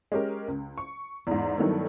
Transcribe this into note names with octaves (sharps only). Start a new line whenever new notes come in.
G#3 C#4 G4 A#4
C#2
C#6
E2 G#2
G2 D#3 F#3 A3 B3 E4